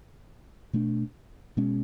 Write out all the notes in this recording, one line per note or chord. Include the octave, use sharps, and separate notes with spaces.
B2 A3 D4
B2 G#3 C#4